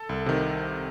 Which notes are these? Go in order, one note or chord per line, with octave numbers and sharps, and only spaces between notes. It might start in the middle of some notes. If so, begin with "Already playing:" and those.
Already playing: A4
C2
C3 D#3